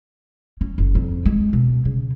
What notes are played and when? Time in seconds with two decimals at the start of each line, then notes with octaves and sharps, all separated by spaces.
0.61 C#4
0.78 F#1
0.95 F2
1.25 G#3
1.53 B2
1.85 C#3